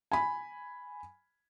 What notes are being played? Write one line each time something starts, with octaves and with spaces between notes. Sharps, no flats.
G#5 B5